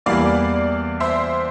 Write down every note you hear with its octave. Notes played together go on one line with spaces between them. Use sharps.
E2 E3 G3 A#3 E4 D5 F5
C5 E5